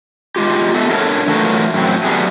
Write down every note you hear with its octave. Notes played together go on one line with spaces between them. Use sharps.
G#3 F4 G4
B3 A4 E5
D4 A4 A#4 C#5
E3 F#3 A3 F4 A#4
F#2 A2 F#3 C4
F#3 G3 A3 B3 G#4